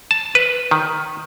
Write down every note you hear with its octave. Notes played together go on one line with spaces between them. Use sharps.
A5
B4
D#3